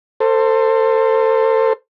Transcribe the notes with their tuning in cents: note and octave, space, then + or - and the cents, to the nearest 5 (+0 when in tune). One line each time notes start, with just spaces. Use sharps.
A4 +30 C5 +0